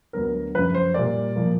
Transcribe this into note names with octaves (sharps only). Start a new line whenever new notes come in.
D2 D3 F#3 B3 A#4
F#2 C#3 F3 B4
C5
A#2 G3 A#3 D5
A#2 F3 A#3